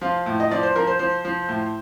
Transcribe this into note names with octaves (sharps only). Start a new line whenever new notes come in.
F3 F4
A2
D#5
F3 D5
C5
F3 A#4
C5
F3 C5
F3
A2